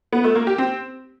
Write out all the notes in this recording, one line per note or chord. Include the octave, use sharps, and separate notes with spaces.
B3
A3
A#3
G4
C4